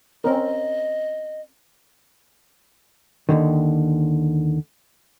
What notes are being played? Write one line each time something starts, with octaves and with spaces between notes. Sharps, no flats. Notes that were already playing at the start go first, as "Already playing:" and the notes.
C4 C#4 A#4 D#5
D#2 A2 D3 D#3